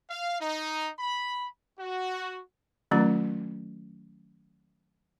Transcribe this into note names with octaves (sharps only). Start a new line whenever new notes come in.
F5
D#4
B5
F#4
D#3 F#3 A3 C#4 F4 A#5